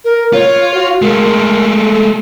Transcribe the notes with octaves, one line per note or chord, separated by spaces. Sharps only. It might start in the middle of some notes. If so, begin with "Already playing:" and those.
A#4
F4 C#5
F#4
G#3 A3 A#4
A4